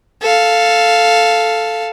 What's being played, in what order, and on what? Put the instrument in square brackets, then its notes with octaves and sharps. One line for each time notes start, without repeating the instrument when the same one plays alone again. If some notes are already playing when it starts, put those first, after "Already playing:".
[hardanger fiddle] A4 F5